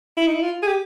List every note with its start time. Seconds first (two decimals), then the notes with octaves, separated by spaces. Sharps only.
0.17 E4
0.27 D#4
0.34 E4
0.43 F4
0.63 G#4
0.67 G4